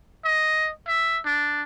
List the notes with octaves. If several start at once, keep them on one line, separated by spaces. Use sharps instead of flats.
D#5
E5
D4